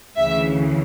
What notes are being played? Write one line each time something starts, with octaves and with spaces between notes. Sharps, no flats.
D2 C#3 E3 E5